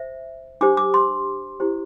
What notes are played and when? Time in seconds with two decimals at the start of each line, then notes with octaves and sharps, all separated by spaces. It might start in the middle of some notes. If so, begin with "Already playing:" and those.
Already playing: C5 E5
0.61 D4 G4 C5 D6
0.77 D6
0.94 C6
1.60 E4 G4 C5